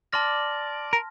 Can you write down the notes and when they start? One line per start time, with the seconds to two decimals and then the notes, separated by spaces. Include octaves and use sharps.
0.13 D5 A5 C6 F6 A#6
0.93 A#4